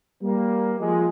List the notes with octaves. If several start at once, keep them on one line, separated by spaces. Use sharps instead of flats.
G3 A#3
F3 G#3